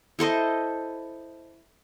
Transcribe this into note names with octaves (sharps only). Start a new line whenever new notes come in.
E4 A4 C5 D#5